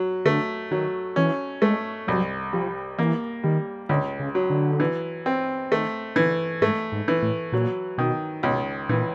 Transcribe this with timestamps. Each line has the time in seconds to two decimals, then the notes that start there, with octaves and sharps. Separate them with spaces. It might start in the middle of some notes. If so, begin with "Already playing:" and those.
Already playing: F#3
0.25 D3 A3
0.71 D#3 F#3
1.16 E3 C#4
1.62 G#3 A3
2.07 C2 F#3
2.53 F3 G3
2.99 E3 A#3
3.43 D#3 G3
3.89 C#2 D3
4.20 C#3
4.35 F#3
4.50 D3
4.80 E3
5.26 C4
5.71 D#3 A3
6.16 D3 E3
6.61 G#2 A3
6.92 G#2
7.08 E3
7.22 A2
7.53 A#2 F#3
7.98 B2 D#3
8.43 C#2 B2
8.89 A#2 E3